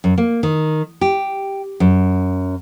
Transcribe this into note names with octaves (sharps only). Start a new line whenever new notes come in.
F#2
A#3
D#3
G4
F#2